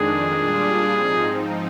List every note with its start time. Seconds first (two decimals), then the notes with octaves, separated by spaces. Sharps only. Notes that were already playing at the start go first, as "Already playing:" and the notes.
Already playing: F2 D#3 G#3 D4 G#4
0.34 A#2 G3 D4 F4
0.92 G#2 F3 C4 D#4